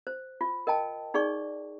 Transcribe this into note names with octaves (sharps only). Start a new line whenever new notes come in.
C5
F4
A#4 D#5 G5 A5
D#4 G#4 D5 C#6